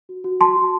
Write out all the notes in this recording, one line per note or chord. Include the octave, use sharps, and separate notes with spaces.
F#4
F#4
F#4 A5 C6
F#4